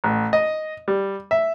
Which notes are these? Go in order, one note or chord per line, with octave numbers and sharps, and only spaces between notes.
A1
D#5
G3
E5